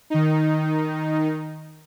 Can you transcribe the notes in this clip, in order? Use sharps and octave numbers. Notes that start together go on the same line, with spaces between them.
D#3 D#4